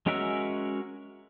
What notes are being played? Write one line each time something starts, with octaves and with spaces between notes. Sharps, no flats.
G#3 C#4 F#4 A#4 E5